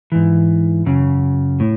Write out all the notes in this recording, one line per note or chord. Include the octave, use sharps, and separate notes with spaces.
G#2 E3
F#2 C#3
A2